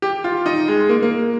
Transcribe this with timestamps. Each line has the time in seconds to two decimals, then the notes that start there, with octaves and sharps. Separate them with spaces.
0.02 G4
0.24 F4
0.46 D#4
0.68 G#3
0.89 A#3
1.02 A#3